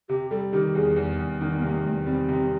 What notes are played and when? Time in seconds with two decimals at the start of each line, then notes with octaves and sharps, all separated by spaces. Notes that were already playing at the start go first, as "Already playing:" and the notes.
0.09 C3 G4
0.31 G3 A4
0.53 D#3 G4
0.75 E2 G#4
0.96 E2
1.18 E2
1.41 D#3 D#4
1.56 B3
1.62 C3 A#3
1.84 E2 A3
2.06 G3 C4
2.29 C3